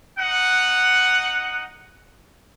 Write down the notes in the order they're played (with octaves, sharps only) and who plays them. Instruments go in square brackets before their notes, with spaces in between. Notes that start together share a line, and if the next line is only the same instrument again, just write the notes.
[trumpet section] D#4 F#5